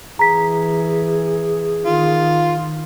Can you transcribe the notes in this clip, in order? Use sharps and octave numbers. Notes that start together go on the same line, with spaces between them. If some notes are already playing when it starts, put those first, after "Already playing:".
E3 G#4 A#5 B6
D#3 F4